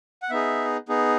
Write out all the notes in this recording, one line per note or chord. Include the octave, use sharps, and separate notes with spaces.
F#5
B3 D#4 G#4 E5
B3 D#4 G#4